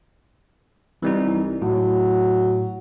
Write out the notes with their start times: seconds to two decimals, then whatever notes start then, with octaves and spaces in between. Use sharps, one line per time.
1.03 C2 E3 G3 D#4
1.62 A2 F#3